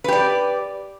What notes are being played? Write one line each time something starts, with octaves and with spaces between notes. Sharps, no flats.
G4 B4 D5